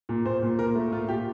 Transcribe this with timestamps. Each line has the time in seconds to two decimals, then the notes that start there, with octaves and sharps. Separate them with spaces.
0.09 A#2
0.26 A#2 C5
0.42 A#2
0.59 A#2 A#4
0.75 A3
0.92 A#2 F4
1.08 A#2 G4